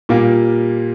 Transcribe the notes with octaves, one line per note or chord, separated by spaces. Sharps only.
A#2 G3 A#3 G4